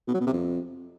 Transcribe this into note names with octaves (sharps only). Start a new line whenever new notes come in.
B2
F#3
B2
C3
F2